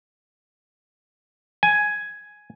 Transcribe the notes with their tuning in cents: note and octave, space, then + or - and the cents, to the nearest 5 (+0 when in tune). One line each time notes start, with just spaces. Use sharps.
G#5 +5